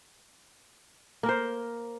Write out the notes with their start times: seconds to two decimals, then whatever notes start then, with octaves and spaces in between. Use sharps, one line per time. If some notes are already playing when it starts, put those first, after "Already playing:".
1.23 A#3
1.26 A#4
1.29 C5